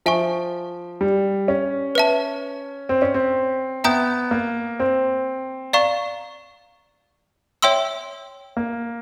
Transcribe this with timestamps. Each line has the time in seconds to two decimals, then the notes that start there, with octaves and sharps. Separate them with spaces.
0.06 F3 E5 G#5 C#6
1.01 G3
1.48 C#4
1.95 B4 E5 A5
2.89 C4
3.02 C#4
3.14 C4
3.84 B3 E5 G5 A#5 D#6 G6
4.31 A#3
4.80 C4
5.73 D5 F5 A#5 C#6
7.62 C#5 E5 G5 C6 E6
8.57 A#3